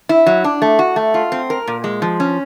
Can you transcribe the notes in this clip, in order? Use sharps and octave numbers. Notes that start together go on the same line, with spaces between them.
E4
F#3
D4
A3
F#4
A3
F4
C4
A#4
A#2
G#3
F3
C#4